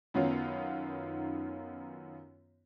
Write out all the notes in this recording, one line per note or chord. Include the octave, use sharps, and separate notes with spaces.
F#2 D#3 B3 C#4 D#4 F4